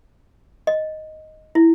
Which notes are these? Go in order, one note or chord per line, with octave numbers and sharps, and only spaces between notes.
D#5
E4